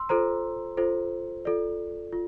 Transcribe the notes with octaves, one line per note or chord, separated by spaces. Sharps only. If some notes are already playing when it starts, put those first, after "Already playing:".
Already playing: C6 E6
F4 A4 C5 A#5
F4 A4 C5
F4 A4 D5
F4